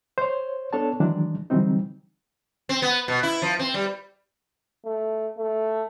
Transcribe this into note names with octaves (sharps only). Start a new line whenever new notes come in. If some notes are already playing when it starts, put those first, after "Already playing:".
C5 C#5
B3 D4 A4 C#5 A5
D#3 E3 F#3 G#3 D4
D3 E3 F#3 G3 C4 D#4
C4
B3
B2
E4
F3
C4
G3
A3
A3